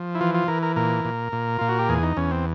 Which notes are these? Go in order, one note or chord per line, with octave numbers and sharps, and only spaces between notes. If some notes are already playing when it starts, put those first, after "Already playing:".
Already playing: F3
E4
E3 F4
F4
E3 A#4
A#4
A#2 A#4
A#2
A#2
A#2 F4
F#4
G4
E2 G#4
D#4
E2 C#4
C4